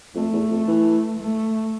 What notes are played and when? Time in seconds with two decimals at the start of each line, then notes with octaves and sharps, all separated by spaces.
0.15 F2 A3
0.33 E2
0.51 F2
0.68 E3
1.19 A3